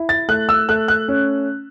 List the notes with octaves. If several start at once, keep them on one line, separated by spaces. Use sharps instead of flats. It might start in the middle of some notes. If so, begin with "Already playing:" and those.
Already playing: E4
A6
A3 F#6
E6
A3 F#6
F#6
C#4